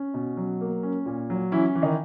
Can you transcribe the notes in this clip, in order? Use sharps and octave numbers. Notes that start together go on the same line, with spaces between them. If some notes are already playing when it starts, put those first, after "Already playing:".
Already playing: C#4
B2
F#3
A#3
C#4
A#2
F#3
E3 C#4 E4
E3
D#3 D#4